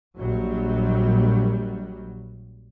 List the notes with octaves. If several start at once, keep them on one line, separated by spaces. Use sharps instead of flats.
A#1 F#3 G3